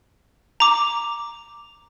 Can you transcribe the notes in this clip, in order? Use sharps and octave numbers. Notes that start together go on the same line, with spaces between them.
A#5 D6